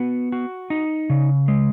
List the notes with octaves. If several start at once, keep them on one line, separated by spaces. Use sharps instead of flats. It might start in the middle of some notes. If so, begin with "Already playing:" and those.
Already playing: B3 F#4
F#4
D#4
C#3
G#3